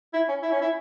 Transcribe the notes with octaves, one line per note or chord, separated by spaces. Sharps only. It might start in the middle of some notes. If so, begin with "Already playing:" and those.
E4
C#4
E4
C#4
E4